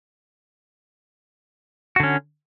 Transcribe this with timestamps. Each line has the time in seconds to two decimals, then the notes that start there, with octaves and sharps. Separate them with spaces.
1.96 F#4
2.00 D3
2.03 C#4